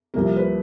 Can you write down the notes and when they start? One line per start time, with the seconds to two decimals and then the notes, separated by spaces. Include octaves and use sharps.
0.14 C2 C3 F3 A#3 A#4
0.36 B4